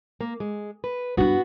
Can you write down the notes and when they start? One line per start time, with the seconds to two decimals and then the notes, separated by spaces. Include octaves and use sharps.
0.21 A#3
0.40 G#3
0.84 B4
1.17 G2 B3 E4 F#4